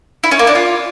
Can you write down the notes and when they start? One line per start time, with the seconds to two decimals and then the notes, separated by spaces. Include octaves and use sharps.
0.24 E4
0.31 C#4
0.39 A#3
0.47 D4
0.55 F4